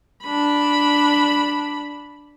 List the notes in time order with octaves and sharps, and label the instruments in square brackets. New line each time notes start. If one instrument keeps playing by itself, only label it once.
[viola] D4 B5